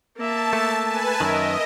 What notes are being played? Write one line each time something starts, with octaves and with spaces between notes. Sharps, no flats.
A#3 E5 A5
A3
B4 G#5 A5
F#2 D#3 A#4 D#5 E5